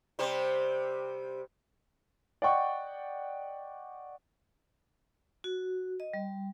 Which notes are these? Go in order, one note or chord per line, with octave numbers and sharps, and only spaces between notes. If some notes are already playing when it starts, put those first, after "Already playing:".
C3 G3 C5
D5 D#5 F#5 G5 C#6
F#4
D#5
G3